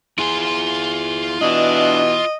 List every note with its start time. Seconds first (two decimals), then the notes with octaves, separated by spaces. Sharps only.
0.19 E4 F4 G#4 C6
1.42 B2 E3 D4 D#5